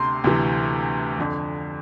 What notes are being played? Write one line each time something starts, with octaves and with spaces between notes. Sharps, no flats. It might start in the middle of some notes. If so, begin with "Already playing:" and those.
Already playing: D2 C3 C6
D2 C3 E3
F2 D3